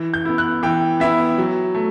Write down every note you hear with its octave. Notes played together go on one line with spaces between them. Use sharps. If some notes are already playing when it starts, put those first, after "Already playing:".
Already playing: E3
G6
B3 E4
F#6
E3 G5
B3 E4 E5
F#3
A3